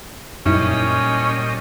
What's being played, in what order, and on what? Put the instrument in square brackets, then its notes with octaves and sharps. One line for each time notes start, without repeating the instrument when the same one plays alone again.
[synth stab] F#2 D#4 E4 [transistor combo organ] A#2 G3 D#5 [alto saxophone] C#4